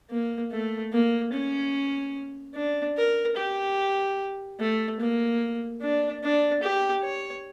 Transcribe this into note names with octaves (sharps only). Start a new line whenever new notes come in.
A#3
A3
A#3
C#4
D4
A#4
G4
A3
A#3
D4
D4
G4
C#5